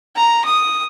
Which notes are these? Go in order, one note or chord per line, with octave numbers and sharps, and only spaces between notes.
A#5
D#6